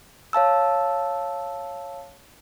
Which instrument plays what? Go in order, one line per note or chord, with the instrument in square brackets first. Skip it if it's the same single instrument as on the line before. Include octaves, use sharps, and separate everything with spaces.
[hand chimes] C#5 F5 A5 E6